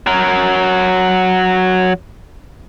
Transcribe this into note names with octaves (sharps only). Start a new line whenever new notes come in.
F#3 A#4